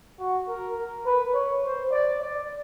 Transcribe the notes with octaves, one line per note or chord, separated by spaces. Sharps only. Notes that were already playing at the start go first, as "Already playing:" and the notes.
F#4
A#4
A#4
B4
C#5
C5
D5
D5